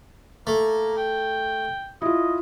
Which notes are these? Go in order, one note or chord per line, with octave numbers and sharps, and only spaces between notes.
A3 A#3
G5
E4 F4 D#5